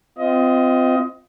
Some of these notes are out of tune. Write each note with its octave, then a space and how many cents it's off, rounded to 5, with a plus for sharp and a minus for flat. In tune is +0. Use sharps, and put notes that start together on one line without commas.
C4 -25 F4 +0 D#5 +20